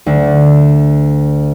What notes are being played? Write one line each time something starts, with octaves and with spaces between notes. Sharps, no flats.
D2